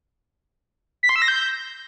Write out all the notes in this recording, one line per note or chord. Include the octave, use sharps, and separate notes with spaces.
B6
C6
E6
A#6
G6